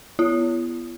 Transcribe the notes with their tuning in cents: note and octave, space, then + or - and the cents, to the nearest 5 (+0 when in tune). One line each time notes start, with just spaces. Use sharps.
B3 +0 E4 +45